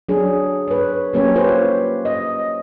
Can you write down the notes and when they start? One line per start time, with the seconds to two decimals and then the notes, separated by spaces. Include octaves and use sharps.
0.09 F#3 D4 G#4
0.68 B4 C#5
1.13 F#3 A#3 C#4 G4 C#5
1.35 F4 G4 B4 C5
2.05 D#5